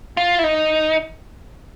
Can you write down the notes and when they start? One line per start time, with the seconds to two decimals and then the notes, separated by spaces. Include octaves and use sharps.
0.17 F4
0.39 E4
0.44 D#4